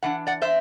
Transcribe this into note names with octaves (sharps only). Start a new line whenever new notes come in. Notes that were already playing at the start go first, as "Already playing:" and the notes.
E3 B3 D4 F#5
D5 F#5
C5 E5